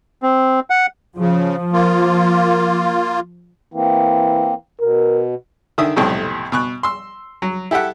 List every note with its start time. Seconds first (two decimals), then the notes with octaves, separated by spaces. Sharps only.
0.22 C4
0.70 F#5
1.18 C#3 F3
1.73 A#3 F4
3.74 E3 A#3 C4
4.81 B2 A#4
5.78 D3 D#3 E5 D#6
5.96 B1 F2 A2 C3
6.52 B2 C#6 F#6
6.83 C6 E6
7.42 F#3
7.71 E4 G4 A4 E5 F#5